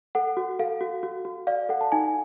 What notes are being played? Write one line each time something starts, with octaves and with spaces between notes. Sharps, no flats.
A4 F#5
F#4
A4 F5
F#4
F#4
F#4
D5 F5
A4 F#5
A5
D#4 G#5